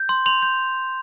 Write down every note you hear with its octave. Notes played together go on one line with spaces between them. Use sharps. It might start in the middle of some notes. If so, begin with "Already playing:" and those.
Already playing: G6
C6
C6 F7
G6